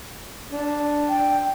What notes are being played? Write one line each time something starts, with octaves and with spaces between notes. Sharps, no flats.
D4
G5